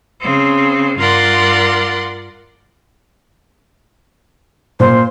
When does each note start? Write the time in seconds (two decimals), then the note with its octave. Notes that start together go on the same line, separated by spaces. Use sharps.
0.22 C#3 C4
0.99 G2 F4 A#4 D5 F#5 C6
4.80 A#2 C5